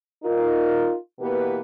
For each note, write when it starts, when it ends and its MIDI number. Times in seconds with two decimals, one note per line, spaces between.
0.24 0.94 63
0.24 0.94 65
0.24 0.94 70
1.20 1.61 47
1.20 1.61 52
1.20 1.61 58
1.20 1.61 59
1.20 1.61 67
1.20 1.61 71